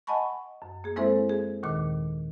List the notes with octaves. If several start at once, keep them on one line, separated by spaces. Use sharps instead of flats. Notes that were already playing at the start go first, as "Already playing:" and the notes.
D#5 F#5 G#5 A5 B5 C#6
F#2
A#3 G#4
G#3 C4 E4 A4 C5 E5
G#4
D#2 A#2 D#3 D6